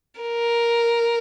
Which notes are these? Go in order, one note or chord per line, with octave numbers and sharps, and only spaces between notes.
A#4